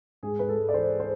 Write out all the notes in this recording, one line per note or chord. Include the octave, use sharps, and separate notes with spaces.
G#2 G#4
G#2 B4
A4
G#3
D5
E3 C5
C5